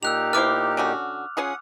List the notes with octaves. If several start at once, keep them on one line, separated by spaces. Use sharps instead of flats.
A#2 D#4 G4 E6 F#6 F7
B3 E4 C5 D6 F6
D3 C#4 F#4
C#4 F4 G#4 F#5 D#6